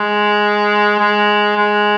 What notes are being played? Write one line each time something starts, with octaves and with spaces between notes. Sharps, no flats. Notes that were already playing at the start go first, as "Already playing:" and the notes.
Already playing: G#3
G#3
G#3